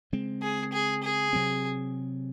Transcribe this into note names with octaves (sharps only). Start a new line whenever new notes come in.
C#3 G#3 C4
G#4
G#4
G#4
C3 F#3 C4